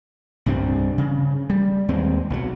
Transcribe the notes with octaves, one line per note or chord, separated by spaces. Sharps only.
C2 G2 G3 C4
C#3
G3
D#2 G#3 C4
B1 D#3 F#3